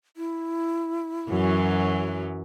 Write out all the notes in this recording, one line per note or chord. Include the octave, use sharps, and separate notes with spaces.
E4
F#2 E3 F#3